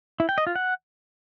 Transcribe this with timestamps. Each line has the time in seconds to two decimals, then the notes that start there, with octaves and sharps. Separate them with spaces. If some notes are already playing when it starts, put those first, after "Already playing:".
0.20 E4
0.29 G5
0.38 D#5
0.47 F4
0.55 F#5